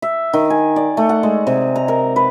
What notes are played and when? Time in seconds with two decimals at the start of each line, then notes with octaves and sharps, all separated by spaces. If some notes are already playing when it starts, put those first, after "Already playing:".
0.02 E5
0.33 D#3
0.50 G#5
0.76 D5
0.97 A3
1.09 F#5
1.23 G#3
1.47 C3
1.76 A#5
1.88 A#4
2.16 B4